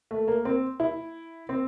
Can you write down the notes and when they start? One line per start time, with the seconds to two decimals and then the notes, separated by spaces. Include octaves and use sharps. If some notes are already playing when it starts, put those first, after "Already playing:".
0.11 A3
0.28 A#3
0.45 C4
0.80 E4
1.49 C4